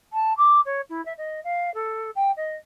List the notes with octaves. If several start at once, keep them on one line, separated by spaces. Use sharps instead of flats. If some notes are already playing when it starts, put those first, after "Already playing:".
A5
D6
C#5
E4
E5
D#5
F5
A4
G5
D#5